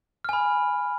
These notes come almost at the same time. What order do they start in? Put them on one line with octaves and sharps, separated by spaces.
F6 G#5 B5